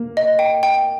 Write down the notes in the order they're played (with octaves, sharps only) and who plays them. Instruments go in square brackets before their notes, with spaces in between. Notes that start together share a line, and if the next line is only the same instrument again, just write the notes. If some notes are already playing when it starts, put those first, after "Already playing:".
Already playing: [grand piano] A#3
[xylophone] D#5
G5
G5